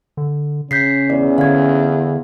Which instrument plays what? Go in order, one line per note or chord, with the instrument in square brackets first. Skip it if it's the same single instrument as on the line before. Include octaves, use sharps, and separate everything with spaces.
[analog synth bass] D3
[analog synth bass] C#3 [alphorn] C#4 [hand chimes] G6 B6 C7
[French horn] E2 [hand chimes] D5
[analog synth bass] D3 [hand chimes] F5 G#6